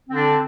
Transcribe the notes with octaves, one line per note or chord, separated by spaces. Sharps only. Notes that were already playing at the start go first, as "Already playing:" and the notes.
D3 C4 D4